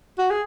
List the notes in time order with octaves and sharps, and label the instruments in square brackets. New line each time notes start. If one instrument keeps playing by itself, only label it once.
[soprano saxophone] F#4
G#4